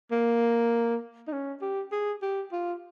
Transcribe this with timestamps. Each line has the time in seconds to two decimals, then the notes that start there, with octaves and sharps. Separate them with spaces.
0.12 A#3
1.28 D#4
1.33 C#4
1.62 G4
1.92 G#4
2.22 G4
2.52 F4